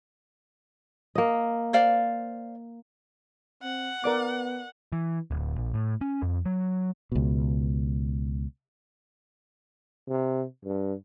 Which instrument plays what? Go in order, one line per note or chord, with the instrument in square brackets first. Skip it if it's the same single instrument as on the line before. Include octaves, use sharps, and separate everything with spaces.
[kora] A#3 D#5
[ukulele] C5 D5 F5
[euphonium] C4 [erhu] F#5
[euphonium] B3 [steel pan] A#4 D5 D6
[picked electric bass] E3
D1
A#1
A2
C#4
F2
F#3
[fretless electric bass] C#2 B2
[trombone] C3
G2